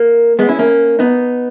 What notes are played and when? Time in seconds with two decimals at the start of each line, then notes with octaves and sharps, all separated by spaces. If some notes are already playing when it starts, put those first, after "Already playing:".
Already playing: A#3
0.39 G#3 B3
0.49 C#4 E4
0.59 A#3 C#4
0.99 B3 D#4